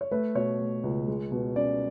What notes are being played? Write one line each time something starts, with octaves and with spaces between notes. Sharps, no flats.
C#5
A3 B4
B2 C#5
A3
C#2
G#3
B2
C#4 D5